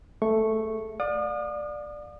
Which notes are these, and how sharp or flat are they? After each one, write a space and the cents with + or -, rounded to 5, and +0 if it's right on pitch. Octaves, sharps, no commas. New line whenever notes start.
A3 +0 G#4 -5 C#6 -10
D5 +10 F5 +40 D#6 -40